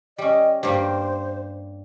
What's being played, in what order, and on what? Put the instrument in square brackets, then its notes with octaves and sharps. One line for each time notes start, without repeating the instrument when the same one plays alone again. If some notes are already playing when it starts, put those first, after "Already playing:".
[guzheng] G3 C#4 [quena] D#5
[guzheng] G2 G3 A#3 [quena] C5